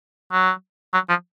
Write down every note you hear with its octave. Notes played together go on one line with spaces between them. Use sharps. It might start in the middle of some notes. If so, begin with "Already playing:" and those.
F#3
F#3
F3